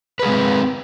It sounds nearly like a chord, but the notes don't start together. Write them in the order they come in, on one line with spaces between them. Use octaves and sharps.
B4 G#4 G#3 C4